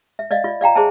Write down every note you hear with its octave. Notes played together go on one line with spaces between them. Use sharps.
E5
D5 D#5 F5
F4 D5
D5 F5 G5 A#5
G#4 C5 D5 E5 G#5 A5